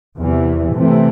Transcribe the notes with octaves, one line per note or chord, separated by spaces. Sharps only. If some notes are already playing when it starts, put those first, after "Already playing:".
E2 C3 E3
C3 E3 A3 C4